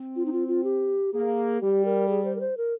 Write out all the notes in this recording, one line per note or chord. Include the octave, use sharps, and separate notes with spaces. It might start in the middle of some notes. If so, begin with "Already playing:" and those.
Already playing: C4
F4
D#4
F4
F4
G4
A#3 G#4
G3 G4
A#4
G#4
C5
A#4
C5
A#4